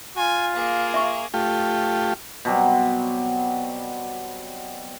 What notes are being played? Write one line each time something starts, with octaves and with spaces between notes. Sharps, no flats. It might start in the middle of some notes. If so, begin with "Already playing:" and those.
F4 G#5
A#3 G#4
E5 A#5 C#6
A3 F4 G4
B2 F#3 G3 C4